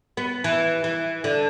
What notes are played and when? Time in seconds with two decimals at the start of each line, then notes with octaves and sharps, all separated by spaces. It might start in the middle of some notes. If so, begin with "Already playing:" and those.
0.17 B3
0.44 E3
0.84 E3
1.24 D3